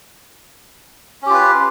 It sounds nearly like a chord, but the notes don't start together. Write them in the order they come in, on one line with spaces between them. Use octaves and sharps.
C#4 G4 F4 B4